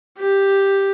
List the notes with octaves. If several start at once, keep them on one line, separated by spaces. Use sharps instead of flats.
G4